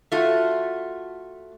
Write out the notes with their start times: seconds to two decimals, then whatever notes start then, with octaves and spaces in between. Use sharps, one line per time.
0.12 A3 F4 F#4